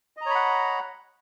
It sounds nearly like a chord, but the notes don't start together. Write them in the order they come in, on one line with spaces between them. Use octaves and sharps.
D#5 A#5 C#5 B5 F#5